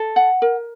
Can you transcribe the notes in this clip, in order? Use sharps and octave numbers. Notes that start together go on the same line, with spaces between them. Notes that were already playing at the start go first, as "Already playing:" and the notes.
Already playing: A4
F#5
A#4